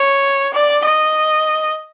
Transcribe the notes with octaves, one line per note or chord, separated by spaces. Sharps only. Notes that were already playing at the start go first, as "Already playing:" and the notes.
Already playing: C#5
D5
D#5